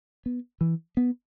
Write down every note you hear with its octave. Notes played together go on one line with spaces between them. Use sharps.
B3
E3
B3